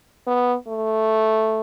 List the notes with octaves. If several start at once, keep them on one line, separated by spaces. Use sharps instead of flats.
B3
A3